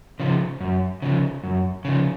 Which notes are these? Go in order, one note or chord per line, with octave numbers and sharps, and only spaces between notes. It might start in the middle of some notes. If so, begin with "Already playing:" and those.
C#3 F3
F#2
C#3 F3
F#2
C#3 F3